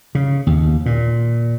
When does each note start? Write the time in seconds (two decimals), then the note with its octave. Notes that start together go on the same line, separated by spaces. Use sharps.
0.15 C#3
0.47 D#2
0.86 A#2